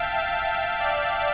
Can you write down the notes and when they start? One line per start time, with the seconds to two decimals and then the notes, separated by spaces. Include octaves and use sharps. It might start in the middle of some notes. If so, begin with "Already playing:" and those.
Already playing: E5 F5 G5 A5
0.19 F5 A5
0.49 E5 G5
0.80 D5 F5